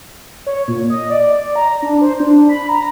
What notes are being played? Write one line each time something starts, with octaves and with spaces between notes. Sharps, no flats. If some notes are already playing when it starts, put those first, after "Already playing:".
C#5
A#2
D#5
D5
A#5
D4
C5
D4
B5
A#5